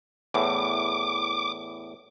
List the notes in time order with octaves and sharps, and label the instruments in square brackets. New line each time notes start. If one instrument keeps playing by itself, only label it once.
[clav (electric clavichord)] E2 A2 [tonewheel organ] D6